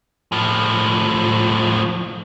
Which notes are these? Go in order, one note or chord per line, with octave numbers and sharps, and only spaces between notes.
A2 F3